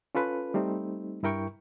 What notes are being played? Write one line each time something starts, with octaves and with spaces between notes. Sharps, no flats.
C#4 F4 A4 B4
G3 A3 C4 D#4
G2 E4 A#4 G5 C#6